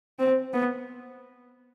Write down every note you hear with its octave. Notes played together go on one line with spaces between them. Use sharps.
C4
B3